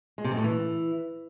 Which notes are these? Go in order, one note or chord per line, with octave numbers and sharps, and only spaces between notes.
G#3
C3
F#2
A2
E3